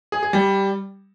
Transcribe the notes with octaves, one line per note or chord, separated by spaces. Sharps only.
G#4
G#4
G3